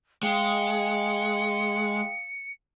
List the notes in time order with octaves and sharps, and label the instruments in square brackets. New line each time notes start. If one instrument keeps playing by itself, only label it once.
[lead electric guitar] G#3 [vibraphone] F5 G5 D#6 [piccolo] C#7